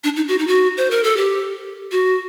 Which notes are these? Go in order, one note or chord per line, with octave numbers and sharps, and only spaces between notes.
D4
D#4
F#4
D#4
F#4
C5
A#4
A4
G4
F#4